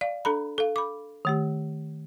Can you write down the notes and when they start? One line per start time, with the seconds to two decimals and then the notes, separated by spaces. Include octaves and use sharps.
0.01 D5 F5
0.25 D4 A4 A#5 B5
0.58 A4 F5
0.76 B5 D6
1.25 D#3 A3 G4